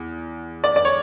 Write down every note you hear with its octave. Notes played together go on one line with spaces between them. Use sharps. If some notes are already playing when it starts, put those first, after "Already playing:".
Already playing: E2
D5
D5
C#5